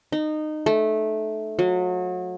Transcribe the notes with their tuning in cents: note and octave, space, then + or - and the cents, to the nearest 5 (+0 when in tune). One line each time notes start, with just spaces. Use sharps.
D#4 -20
A3 -15
F#3 -35